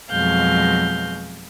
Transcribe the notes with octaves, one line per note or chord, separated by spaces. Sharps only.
F2 B2 F#3 G#3 F5 G6